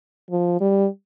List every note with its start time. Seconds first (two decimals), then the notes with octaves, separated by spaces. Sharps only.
0.31 F3
0.61 G3